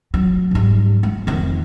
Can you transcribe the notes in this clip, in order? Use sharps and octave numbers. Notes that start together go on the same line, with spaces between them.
F#3
G#2 G3
G#3
F2 D#3